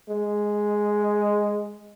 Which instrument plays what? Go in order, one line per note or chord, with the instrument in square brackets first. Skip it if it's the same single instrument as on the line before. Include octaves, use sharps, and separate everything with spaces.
[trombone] G#3